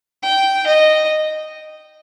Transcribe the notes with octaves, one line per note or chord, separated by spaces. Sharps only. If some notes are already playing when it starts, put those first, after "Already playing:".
G5
D#5